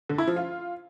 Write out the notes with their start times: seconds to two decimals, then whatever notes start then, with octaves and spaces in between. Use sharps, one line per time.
0.09 D3
0.18 E4
0.27 F3
0.36 F4